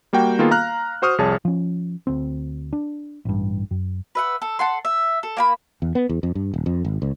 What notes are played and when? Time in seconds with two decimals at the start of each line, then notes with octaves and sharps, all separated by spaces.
0.13 G3 A#3 F#4 G5
0.39 D#3 A#3 B3 F4 G#4 A4
0.51 F5 A#5 F6 F#6
1.02 F#4 C5 C#6 D#6 F6
1.18 C2 F2 G#4 C#5 A5
1.45 F3 C#4
2.07 D2 C4
2.73 D4
3.25 A1 G2
3.71 F#2
4.15 B4 E5 F#5
4.42 A4
4.59 A4 F#5 C6
4.85 E5
5.23 A4
5.37 A#3 G5 B5
5.82 E2
5.95 B3
6.09 E2
6.23 F2
6.35 G2
6.54 D#1
6.66 F2
6.85 G#1
7.02 C#2